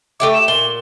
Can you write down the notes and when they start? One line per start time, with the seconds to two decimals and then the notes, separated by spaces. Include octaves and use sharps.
0.20 A3 G4 E5 D6
0.34 E7
0.48 A#2 G7